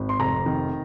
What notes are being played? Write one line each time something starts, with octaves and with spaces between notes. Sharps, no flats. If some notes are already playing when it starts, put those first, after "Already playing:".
Already playing: G#1
C6
F1 A#5
D#3